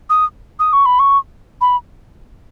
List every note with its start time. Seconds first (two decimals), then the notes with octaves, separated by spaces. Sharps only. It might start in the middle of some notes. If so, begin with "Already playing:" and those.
0.10 D#6
0.60 D#6
0.73 C#6
0.86 B5
0.99 C#6
1.61 B5